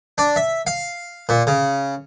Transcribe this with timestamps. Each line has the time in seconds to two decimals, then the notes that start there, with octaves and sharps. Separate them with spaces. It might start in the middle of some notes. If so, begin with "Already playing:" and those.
0.18 D4
0.36 E5
0.67 F5
1.29 A#2
1.47 C#3